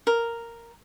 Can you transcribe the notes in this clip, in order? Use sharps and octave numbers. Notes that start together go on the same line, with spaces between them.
A#4